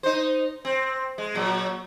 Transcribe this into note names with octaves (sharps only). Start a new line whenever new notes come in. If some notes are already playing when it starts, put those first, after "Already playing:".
D#4 C5
C4
G#3
A#2 F#3